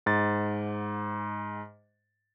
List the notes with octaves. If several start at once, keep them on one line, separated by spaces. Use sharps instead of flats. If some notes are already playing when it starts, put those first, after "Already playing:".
G#2 A6